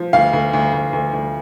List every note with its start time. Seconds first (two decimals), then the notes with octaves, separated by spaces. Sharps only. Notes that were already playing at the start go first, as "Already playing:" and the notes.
Already playing: F3
0.13 D2 F5
0.33 D2
0.53 D2
0.73 D2
0.93 D2
1.13 D2